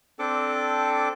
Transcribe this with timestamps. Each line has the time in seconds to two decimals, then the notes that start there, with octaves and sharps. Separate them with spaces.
0.19 C4 D4 A4 D6